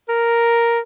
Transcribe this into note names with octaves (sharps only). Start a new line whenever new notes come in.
A#4